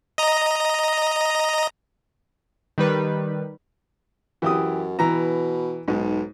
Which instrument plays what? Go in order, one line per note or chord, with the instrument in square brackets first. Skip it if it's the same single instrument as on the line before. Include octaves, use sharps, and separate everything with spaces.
[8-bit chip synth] D#5 A#5
[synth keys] D#3 G3 B4
[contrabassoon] F#2 [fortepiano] E3 G4 D#6
[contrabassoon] B2 [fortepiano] E3 A#5
[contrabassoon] B1 [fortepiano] G#2